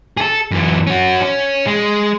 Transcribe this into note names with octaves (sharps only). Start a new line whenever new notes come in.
G#4 A4
F#2 E3
C#4 F#4
C#4
G#3